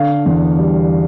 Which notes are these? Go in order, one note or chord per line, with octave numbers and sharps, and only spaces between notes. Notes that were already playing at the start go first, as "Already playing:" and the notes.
Already playing: D3 F5
E2
G3